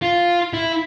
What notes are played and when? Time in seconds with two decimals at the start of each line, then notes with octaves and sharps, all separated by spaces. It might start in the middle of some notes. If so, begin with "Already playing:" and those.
0.02 F4
0.53 E4